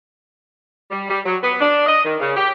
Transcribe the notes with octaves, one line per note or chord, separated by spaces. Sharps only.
G3
G3
F#3
B3
D4
D#5
D#3
C#3
G4